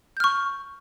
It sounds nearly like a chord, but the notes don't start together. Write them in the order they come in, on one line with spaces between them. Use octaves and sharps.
G6 F6 C#6